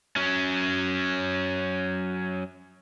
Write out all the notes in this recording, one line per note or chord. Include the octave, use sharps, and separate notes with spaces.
F#3 C#4